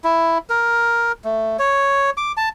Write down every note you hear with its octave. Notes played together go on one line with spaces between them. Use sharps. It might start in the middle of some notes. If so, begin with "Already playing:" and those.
E4
A#4
A3
C#5
D6
A5